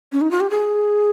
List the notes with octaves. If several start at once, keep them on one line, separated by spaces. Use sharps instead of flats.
C#4
D#4
F4
G4
G#4